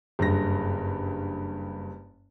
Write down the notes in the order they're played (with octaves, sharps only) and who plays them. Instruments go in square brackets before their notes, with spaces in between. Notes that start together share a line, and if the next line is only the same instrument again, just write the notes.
[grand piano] F#1 G2 A#6